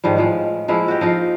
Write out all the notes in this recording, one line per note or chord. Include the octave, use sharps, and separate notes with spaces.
G#2 D#3 F3 G3
A2 F3 G#3
F3 G#3 A#3 E4
F#4 G4
F3 D#4 F4